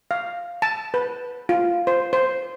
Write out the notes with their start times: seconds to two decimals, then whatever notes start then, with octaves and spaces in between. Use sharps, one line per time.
0.11 F5
0.62 A5
0.94 B4
1.49 F4
1.87 C5
2.13 C5